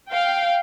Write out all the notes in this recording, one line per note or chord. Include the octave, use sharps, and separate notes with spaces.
F5 G5